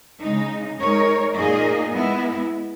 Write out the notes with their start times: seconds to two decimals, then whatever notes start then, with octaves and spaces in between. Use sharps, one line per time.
0.22 C#3 G#3 D#4
0.79 G#3 D#4 A#4 C#5
1.35 A#2 A#3 D#4 G#4 D#5
1.93 G#3 B3 E4